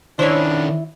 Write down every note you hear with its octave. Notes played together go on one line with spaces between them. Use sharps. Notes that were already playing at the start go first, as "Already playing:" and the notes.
D#3 C#4 D4 E4 C5 C#5